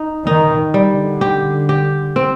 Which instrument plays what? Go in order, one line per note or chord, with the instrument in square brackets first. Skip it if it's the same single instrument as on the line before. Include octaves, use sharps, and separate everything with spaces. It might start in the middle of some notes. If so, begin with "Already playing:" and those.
Already playing: [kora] D#4
[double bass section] D#3 [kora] D#4
[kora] G3
[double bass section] D3
[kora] G4
G4
C4